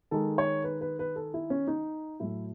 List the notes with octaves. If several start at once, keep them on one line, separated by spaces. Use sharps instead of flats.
D#3 G#3 A4
C#5
B4
B4
B4
A4
E4
C#4
D#4
A2 F#3 A3 E4